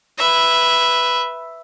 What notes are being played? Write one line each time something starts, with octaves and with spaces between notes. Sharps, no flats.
B4 E5